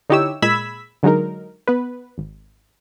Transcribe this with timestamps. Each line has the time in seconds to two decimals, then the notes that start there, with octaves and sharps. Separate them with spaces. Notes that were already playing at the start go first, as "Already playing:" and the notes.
0.10 D3 D#4 E4 G4 C#5 E6
0.42 A#2 G#3 B5 E6 G#6 B6
1.03 D3 F#3 G#3 D#4 A#4
1.68 B3 B4
2.18 G#1